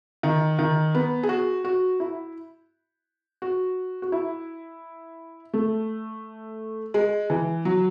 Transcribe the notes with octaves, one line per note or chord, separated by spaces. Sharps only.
D#3
D#3
B3
G#4
F#4
F#4
E4
F#4
F#4
E4
A3
G#3
E3
F#3